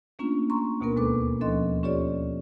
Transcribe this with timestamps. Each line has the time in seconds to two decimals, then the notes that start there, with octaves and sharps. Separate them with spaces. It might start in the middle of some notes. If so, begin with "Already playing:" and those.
0.19 A3 A#3 C#4 D4 F4
0.50 A#5 C6 C#6
0.80 D2 B2 A#3 B3 A#4
0.96 D#2 G#3 A4 B4 D6
1.41 D#2 F3 C#4 A4 D#5 C6
1.83 C#4 F4 G4 A4 C#5 D5